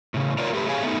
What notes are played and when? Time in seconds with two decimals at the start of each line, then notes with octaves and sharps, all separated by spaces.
0.14 A2 C#3
0.38 F4 A#4 B4 C#5 D5
0.53 A3 G4 B4
0.68 G4 G#4 C#5 F5 G#5
0.82 A3 B3 D#4